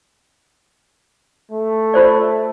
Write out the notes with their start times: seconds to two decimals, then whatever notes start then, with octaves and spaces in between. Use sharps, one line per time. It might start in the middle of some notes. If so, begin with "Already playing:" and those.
1.51 A3
1.94 F4 C5 D5